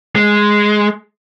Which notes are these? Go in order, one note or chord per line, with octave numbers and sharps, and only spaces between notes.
G#3